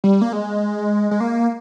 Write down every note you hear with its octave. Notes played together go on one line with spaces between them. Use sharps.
G3
A#3
G#3
G#3
A#3